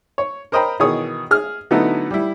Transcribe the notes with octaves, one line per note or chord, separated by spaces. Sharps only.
C#5
A#4 C5 D#5 G5 A#5 B5
B2 D#3 E3 G#4 C#5 D#6
G#4 F6
D3 F#3 A3 B3 D#4 E4
G3 E4